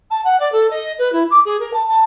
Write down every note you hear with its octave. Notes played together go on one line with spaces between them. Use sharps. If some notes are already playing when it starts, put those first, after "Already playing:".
A5
F#5
D5
A4
D#5
B4
E4
D6
G#4
A#4
A5
A5